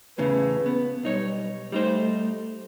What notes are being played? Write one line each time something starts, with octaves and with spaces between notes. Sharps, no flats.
E2 A2 C#3 B4
B3
B1 G3 D#4 C#5
G3 A3 D#4 C5